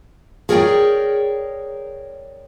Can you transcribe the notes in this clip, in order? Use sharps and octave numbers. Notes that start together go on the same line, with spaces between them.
G#4 A#4 C#5 D5 G5